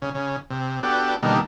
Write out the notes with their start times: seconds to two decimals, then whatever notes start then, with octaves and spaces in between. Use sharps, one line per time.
0.02 C#3
0.14 C#3
0.50 C3
0.83 B3 D4 F#4 G4 A4
1.23 B2 D3 D#3 G3 A3 A#3